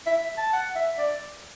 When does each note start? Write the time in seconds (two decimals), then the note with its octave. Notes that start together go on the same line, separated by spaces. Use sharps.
0.07 E5
0.38 A5
0.53 F#5
0.75 E5
0.98 D5